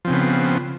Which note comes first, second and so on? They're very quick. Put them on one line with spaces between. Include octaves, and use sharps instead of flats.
F3 C4 C#3 B3